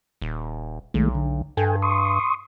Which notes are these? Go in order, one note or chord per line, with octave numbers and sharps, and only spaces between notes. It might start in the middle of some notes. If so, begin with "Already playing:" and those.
D#1
B1 D#3 G#3 A3
D3
G2 A4 G5 G#5
C6 C#6 D#6